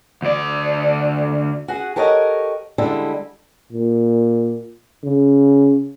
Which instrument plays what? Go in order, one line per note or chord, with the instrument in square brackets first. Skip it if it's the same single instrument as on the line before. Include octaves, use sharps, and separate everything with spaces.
[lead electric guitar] D2 D5
[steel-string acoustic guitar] F#4 G#4 F#5
G4 A4 A#4 C#5 D#5 F#5
D3 G3 G#3 E4 A4
[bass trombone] A#2
C#3